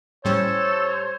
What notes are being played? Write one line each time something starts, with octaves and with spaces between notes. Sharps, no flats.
A2 G3 C#4 A4 C5 C#5